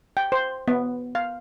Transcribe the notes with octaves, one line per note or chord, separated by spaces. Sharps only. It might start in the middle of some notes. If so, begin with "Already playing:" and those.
G5
C5
B3
F5